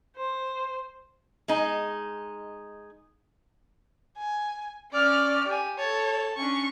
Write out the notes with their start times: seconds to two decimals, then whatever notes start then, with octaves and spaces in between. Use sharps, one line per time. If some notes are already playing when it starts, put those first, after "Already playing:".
0.17 C5
1.48 G#3 D#4
4.18 G#5
4.93 C#4 D5 F6
5.47 G4 G#5
5.78 A4 C#5 A5
6.37 C#4 D4 C#6